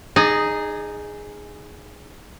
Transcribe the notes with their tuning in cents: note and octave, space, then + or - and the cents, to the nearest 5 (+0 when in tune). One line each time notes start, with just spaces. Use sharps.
D#4 -5 G#4 +0 D5 +40